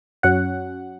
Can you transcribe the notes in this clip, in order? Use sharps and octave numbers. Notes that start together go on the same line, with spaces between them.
F#2 F#3 C#4 F#5